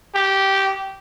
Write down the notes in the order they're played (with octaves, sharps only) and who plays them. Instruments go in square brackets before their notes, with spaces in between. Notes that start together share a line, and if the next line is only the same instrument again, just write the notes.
[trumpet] G4